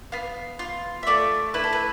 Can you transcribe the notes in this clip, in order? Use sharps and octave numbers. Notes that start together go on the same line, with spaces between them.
B3 F5
F4
E5
A3 D5
E4 B4
A4
B4